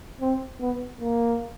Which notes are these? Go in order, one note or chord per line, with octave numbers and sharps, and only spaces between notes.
C4
B3
A#3